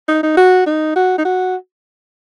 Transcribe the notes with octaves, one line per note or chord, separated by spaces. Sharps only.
D#4
D#4
F#4
D#4
F#4
D#4
F#4